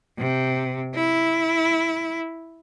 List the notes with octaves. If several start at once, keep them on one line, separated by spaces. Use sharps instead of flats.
C3
E4